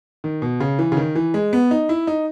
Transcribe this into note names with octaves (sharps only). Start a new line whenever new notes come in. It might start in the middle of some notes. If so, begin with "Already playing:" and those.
D#3
B2
C#3
E3
C#3
D#3
E3
G#3
B3
D#4
E4
D#4